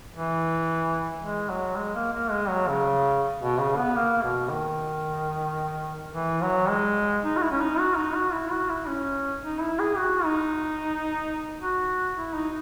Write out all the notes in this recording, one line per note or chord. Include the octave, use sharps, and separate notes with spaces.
E3
G#3
F#3
G#3
A#3
A#3
G#3
F#3
C#3
B2
C#3
B3
A#3
B2
D#3
E3
F#3
G#3
D#4
F#4
E4
C#4
D#4
F#4
D#4
F#4
E4
F#4
E4
C#4
D#4
E4
G#4
F#4
D#4
F#4
E4
D#4